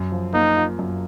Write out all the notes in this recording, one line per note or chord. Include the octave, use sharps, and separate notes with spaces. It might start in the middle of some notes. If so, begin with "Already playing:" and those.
Already playing: F#2
F3
A#3 D#4
F4
F#2